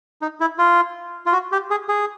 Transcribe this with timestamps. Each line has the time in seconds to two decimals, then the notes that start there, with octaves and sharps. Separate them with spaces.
0.22 D#4
0.40 E4
0.58 F4
1.26 F4
1.33 F#4
1.52 G4
1.70 G#4
1.89 G#4